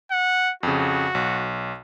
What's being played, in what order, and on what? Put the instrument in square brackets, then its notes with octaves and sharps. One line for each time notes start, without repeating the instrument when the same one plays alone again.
[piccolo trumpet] F#5
[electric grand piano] F2 C#3 [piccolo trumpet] F#4
[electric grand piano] B1